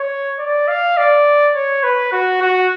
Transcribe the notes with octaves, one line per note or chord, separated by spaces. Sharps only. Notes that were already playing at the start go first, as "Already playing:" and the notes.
Already playing: C#5
D5
F5
D5
C#5
B4
F#4
F#4